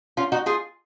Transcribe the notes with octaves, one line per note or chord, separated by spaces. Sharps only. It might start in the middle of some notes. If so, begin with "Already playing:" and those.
C#4 F4
D#4 F#4
F4 G#4